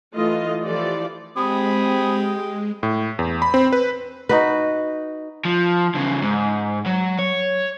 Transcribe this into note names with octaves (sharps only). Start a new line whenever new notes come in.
E3 A3 F4 D#5
E3 F3 F4 G4 A4 D5
G#3 C4 G4 G#4 B5 D#6
A2
E2
B5
C4
B4
D#4 F#4 B4
F3
E2 C#3
G#2
F#3
C#5